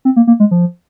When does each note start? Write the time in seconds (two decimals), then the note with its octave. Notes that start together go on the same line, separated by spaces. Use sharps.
0.05 C4
0.16 A#3
0.27 A#3
0.40 G#3
0.51 F3